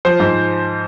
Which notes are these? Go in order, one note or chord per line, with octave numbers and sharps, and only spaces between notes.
F3 C5
G#2